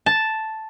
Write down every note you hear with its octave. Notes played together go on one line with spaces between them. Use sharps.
A5